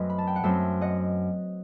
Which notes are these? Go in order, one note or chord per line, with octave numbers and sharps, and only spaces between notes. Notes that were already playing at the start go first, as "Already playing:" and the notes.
Already playing: F#2 F#3 A3 C4 B4 D#5
B5
A5
G5
F#5
F#2 F#3 A3 C4 C5 E5
D#5 F#5